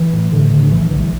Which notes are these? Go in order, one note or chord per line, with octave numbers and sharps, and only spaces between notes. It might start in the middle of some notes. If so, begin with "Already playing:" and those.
Already playing: E3
A2
A2 D3
A1 D3
D3
B1 E3
E3
B1 D3 F#3
E3 G#3